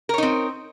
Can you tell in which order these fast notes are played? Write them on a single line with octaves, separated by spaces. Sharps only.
A#4 C#5 D#4 C4